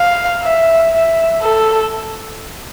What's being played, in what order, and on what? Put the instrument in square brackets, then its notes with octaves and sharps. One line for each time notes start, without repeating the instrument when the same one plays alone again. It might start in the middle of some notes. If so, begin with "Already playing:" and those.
Already playing: [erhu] F5
E5
E5
A4